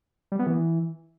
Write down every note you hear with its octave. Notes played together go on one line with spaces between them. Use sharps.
G3
B3
E3